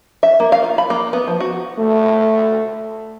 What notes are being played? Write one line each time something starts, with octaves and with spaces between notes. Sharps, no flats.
E5
A#3
F5
F4
B5
A#3
B3
F3
F#4
A3